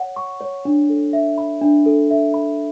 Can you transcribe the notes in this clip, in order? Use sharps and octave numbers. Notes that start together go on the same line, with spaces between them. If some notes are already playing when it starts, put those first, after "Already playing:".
Already playing: C#5 F#5
C#6
C#5
D4
A4
E5
B5
D4
A4
E5
B5